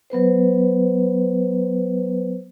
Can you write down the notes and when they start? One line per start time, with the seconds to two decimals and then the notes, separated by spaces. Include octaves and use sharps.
0.10 F#3 B3 B4 C5